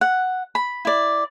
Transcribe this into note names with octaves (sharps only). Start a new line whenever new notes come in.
F#5
B5
E4 D5